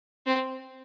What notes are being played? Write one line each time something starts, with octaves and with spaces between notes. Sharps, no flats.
C4